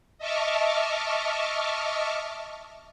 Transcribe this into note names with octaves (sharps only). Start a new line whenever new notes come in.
D#5 E5 A5 C#6 D6 F6